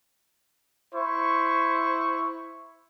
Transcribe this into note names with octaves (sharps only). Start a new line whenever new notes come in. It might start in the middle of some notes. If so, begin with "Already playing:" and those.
E4 C5 C#6